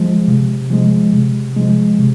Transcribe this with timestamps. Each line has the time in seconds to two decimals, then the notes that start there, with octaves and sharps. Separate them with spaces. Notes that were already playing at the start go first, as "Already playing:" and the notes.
Already playing: F3 G#3
0.28 C3
0.70 F3 G#3
1.13 C3
1.56 F3 G#3
1.99 C3